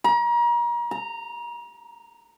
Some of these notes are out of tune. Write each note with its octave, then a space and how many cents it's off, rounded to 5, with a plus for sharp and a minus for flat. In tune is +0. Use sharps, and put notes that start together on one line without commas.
A#5 +35
A#5 -15